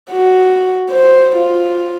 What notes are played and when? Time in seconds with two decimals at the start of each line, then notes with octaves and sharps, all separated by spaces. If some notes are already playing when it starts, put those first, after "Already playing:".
0.10 F#4
0.90 C5
1.36 F4